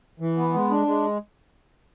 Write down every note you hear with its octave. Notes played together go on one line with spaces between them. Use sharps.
E3
B3
G#3
D4
G#3